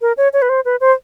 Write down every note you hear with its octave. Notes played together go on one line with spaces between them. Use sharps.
A#4
C#5
C#5
B4
C5
B4
C5